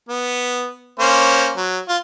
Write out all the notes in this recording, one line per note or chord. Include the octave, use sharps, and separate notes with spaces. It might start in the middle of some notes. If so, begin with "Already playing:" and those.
B3
A#3 C#4 C5
F#3
F4